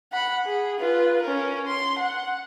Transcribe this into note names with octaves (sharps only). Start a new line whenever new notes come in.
F#5 B5
G#4
F4 B4
C#4 A#4
C6
F#5